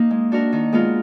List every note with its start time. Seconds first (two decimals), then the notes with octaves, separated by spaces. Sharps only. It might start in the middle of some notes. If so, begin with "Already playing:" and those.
Already playing: A#3 D#4
0.11 G#3
0.32 D4 F#4 A#4
0.52 D#3
0.73 G#3 B3 F4 A#4